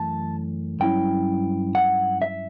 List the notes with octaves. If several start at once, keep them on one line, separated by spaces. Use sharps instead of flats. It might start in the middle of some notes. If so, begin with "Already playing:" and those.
Already playing: F#2 E3 A3 A5
G2 F#3 C#4 E4 G5
F#5
E5